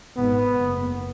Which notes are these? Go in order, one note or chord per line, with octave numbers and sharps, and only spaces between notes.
G#1 G#2 B3
F#1